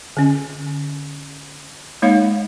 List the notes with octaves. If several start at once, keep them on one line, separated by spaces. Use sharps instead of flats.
D3 C#4
G#3 A#3 D#4 C#5 F5